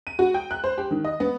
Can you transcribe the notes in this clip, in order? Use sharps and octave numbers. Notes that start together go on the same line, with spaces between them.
D#7
F#4
G5
F#6
C5
G4
D#3
D#5
B3